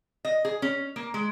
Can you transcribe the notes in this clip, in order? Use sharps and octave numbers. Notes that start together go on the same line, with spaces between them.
D#5
G#4
C#4
A#3
G#3